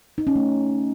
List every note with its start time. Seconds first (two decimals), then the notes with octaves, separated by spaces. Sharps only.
0.18 D#4
0.27 C#4
0.36 A3